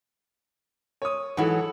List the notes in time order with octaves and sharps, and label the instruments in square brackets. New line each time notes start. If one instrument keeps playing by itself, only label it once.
[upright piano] C#5 D#6
[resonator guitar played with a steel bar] G#2 E3 F#3 [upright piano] A4 F#5